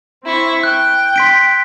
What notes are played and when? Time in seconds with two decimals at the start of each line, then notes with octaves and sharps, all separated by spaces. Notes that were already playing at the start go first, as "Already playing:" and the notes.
0.23 C4 E4 C#6
0.63 G5 F#6
1.16 C6 B6 D7